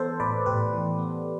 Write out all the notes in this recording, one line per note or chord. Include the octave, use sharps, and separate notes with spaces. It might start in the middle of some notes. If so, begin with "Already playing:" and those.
Already playing: E3 B3 A4 C5
A2 B4 D5
A2 G4 B4
E3
B3